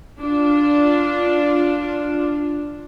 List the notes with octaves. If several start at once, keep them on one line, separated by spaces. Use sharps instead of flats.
D4 F4